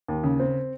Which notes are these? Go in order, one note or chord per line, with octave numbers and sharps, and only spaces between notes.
D#2
C#3
C4